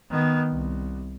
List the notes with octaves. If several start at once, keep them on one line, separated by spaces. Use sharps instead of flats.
D#3 B3
C2